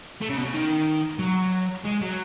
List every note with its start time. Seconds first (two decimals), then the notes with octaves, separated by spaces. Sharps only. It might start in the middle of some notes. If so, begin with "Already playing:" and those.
0.21 A3
0.29 C#3
0.37 B2
0.45 C#3
0.54 D#3
1.19 F#3
1.85 G#3
2.02 F#3